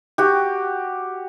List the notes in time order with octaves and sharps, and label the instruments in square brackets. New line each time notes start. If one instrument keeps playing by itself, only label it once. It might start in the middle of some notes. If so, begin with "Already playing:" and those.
[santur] F#4 G4